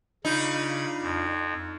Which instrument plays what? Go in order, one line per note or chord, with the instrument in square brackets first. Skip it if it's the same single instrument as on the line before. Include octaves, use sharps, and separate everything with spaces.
[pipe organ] C#3 B5 [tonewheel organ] D4 F4 [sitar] D#4
[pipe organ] F2